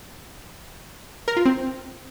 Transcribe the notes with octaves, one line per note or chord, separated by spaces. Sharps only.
A#4
F4
C4